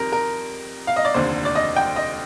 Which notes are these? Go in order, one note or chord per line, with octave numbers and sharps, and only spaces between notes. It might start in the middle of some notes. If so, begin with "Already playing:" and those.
Already playing: F2 D#3 G3 C4 A#4
A#4
F5
D#5
D5
F1 D#2 D3 C5
D5
D#5
G5
D#5